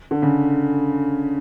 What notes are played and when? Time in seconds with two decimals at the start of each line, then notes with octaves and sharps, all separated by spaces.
0.11 D3
0.22 C#3